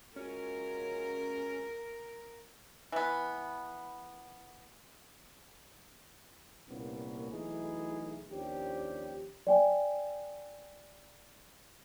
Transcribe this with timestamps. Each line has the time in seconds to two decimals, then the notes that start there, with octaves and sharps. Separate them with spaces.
0.16 G#3 C#4 F4 F#4 A#4
2.92 E3 B3
6.70 C2 A#2 A#3 B3 C#4
7.32 B1 E3 A3 D#4 E4 G#4
8.31 D#2 F3 C#4 D4 G4
9.47 D5 G5 G#5